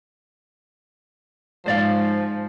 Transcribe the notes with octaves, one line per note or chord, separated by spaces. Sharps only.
G#2 F3 C5 D5 F5